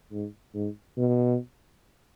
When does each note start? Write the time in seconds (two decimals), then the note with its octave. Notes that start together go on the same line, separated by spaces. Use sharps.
0.12 G#2
0.54 G#2
0.97 B2